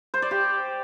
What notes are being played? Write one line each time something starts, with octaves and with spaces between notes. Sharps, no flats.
C5
D5
G4